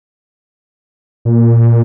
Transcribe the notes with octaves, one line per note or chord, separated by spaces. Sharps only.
A#2